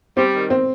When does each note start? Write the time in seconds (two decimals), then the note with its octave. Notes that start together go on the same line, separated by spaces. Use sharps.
0.17 G3 C4
0.33 D#3
0.50 C4